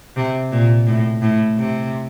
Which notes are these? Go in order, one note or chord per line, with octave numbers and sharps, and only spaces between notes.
C3
A#2
A2
A2
C3